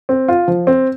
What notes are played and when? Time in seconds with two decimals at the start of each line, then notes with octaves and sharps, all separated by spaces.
0.09 C4
0.28 F4
0.48 F3
0.67 C4